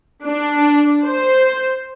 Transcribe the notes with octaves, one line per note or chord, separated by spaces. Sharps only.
D4
C5